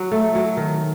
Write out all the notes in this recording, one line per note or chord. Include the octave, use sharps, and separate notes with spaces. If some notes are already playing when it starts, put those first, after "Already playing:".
Already playing: F#3
A3
F#3
D#3